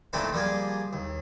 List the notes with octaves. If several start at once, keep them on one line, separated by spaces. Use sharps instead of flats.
A#2 D#3 A3 A#3 C4 E4
F3 G3 A#3 G#4
D#2